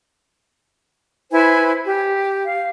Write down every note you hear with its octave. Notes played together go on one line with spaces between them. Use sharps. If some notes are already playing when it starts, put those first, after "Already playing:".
E4 B4 C5 G#5
G4
F5